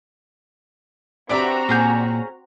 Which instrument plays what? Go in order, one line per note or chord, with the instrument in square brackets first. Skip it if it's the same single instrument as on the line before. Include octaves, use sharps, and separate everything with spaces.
[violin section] C4 F#4 A#5 [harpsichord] D4 G4 [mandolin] B4 D5 E5
[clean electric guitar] A#2 [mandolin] C#4 G#4 G6